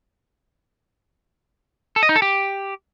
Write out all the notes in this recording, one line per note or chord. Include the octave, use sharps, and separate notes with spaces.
A4
D#5
D#4
A4
G4